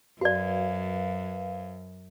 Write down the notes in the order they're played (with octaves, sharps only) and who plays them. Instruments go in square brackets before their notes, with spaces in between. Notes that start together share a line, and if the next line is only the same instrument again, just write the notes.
[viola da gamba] F#2 [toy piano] F#4 D5 [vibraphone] B4 C5 F5